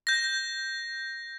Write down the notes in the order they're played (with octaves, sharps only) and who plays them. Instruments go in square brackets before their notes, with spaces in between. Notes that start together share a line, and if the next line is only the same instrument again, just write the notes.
[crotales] G6 A#6